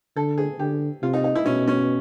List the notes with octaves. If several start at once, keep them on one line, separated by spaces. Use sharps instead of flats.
D3 A4
G#4
D3 G4
C3 F4
D#4
D#4
E4
B2 C#4
C#4